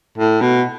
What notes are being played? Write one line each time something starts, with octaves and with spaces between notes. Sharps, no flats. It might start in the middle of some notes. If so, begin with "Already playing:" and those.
A2
B2